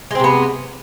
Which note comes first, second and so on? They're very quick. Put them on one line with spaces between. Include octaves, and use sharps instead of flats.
G#3 C4 C3 B3